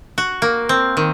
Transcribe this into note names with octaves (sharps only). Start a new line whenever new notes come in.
F#4
A#3
C4
D#3